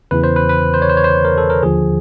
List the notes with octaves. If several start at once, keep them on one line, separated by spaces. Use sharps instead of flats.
E2 C#3 E3 B4
C5
B4
B4
C5
C#5
C5
C#5
C5
A#4
A4
A#4
D#2 D3 F3 G#4